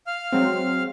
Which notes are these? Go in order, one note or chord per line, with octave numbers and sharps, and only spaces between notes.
F5 F6
F#3 G#3 C4